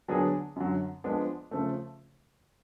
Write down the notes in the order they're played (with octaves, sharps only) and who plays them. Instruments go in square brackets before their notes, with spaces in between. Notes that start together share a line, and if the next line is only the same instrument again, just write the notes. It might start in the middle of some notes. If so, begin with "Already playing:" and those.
[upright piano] D3 F#3 B3 D4 G#4
F#2 D3 F#3
F3 G#3 B3 D4
C#3 F3 A3